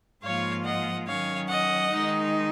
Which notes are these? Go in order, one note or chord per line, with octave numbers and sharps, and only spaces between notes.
G#2 F3 A#3 F4 C#5 F5
D#5 F#5
D#3 F#3 C#4 C#5 F5
D#5 F#5
D#3 G#3 D#4